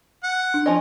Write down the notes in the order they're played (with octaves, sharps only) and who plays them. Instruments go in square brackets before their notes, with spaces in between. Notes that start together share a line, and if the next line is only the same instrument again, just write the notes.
[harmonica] F#5
[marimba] D4
[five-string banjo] F3 C#4 D#5 [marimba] D5